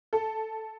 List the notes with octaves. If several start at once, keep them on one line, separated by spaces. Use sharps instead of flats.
A4